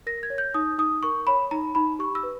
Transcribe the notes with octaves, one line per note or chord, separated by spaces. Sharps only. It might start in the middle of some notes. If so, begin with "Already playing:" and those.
A#4 A#6
G#6
C#5
G6
D#4 D#6
D#4 D#6
A#4 C#6
C#5 B5
D#4 A#5
D#4 B5
G4 C#6
E6
B4